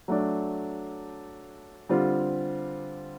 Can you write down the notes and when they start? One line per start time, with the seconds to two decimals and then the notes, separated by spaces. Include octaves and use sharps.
0.08 F#3 A3 D4
1.89 D3 G3 C4 F4